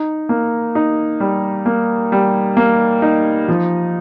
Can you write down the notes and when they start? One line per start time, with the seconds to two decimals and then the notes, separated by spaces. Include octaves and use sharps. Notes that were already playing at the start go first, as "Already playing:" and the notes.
Already playing: D#4
0.29 A#3
0.75 D#4
1.20 G3
1.66 A#3
2.12 G3
2.57 A#3
3.02 D#4
3.48 F3